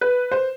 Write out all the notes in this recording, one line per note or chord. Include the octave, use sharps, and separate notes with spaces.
B4
C5